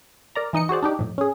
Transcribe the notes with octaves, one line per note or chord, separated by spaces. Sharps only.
A#4 D5 A#5
E3 D#4 D#5 C#7
F#4 G#4 C5 D5
D4 D#4 G4
F2 A2
C#4 G#4